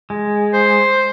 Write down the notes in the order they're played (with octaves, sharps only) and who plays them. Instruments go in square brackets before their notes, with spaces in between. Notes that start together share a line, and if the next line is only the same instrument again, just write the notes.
[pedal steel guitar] G#3
[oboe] C5